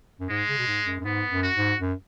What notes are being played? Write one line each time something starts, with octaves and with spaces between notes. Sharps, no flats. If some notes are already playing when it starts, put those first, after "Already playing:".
F#2
G#2 G#3
C#3
B2
G#2
F#2
F#2
G#2 B3
F#2
F#4
G#2
F#2